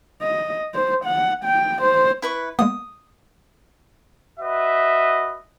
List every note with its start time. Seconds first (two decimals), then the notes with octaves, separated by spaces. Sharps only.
0.22 D#5
0.74 C5
1.05 F#5
1.45 G5
1.82 C5
2.22 E4 B4 C#6
2.59 G#3 A#3 B3 D#6
4.40 F#4 B4 D#5 E5